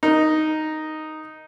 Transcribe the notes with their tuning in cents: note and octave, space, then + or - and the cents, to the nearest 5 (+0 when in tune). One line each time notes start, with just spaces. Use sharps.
D#4 +0 A#4 +0